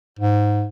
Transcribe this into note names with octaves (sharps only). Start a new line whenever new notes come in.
G#2